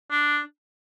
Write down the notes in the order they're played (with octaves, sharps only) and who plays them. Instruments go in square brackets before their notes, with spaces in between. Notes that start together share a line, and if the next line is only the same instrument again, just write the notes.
[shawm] D4